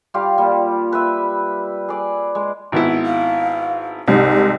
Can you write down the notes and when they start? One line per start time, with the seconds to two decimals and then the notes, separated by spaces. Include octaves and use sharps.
0.14 G3 F4 G4 F5
0.38 A#2 G3
0.92 B4 E5
1.88 G#4 D5
2.35 G#3
2.72 G#1 B3 E4
3.05 F5
4.08 C2 G#2 C3 G4